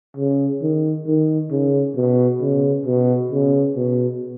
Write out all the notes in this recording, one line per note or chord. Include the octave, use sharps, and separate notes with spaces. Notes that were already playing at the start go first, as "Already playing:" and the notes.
C#3
D#3
D#3
C#3
B2
C#3
B2
C#3
B2